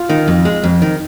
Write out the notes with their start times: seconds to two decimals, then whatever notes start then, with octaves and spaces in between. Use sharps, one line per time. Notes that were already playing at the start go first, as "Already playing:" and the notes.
Already playing: F4
0.09 D#3
0.28 F2
0.45 G#3
0.64 F2
0.82 D#3